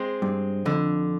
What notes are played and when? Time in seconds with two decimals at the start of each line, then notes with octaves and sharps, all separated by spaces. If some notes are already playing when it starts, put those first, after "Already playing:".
Already playing: G#3 C4
0.22 G2
0.65 F2 D3